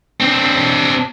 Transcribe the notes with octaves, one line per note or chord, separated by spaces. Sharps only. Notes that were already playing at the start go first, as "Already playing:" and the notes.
C4 D4